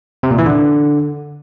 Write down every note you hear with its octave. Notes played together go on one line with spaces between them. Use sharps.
C3
A#2
E3
D3